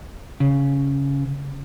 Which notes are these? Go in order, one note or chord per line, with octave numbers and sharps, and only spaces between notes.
C#3